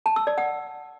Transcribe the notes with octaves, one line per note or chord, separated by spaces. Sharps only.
A5
E6
D5
F#5